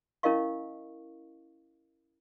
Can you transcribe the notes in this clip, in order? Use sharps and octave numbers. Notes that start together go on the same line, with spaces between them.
C#4 E4 A#4 D#5 F5 C#6